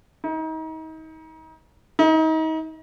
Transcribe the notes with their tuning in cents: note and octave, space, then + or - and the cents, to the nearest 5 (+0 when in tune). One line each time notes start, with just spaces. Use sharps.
D#4 +35
D#4 +35